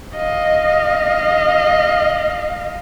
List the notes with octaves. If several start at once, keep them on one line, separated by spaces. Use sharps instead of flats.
D#5 F5